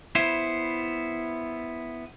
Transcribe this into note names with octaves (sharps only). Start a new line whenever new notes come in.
B3 E4 C5